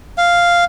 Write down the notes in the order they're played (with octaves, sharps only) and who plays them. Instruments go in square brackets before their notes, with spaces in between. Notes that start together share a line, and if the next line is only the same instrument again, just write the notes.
[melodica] F5